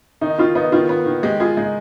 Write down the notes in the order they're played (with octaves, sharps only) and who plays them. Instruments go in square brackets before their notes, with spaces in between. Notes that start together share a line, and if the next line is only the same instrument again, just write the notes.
[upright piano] D#3 [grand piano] D#4
[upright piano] D#3 [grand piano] F4
[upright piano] B3 [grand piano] D#4
[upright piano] D#3 [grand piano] F4
[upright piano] B3
D#3
[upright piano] G#3 [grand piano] G4
[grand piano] F4 [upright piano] G#4
[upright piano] G#3 [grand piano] D#4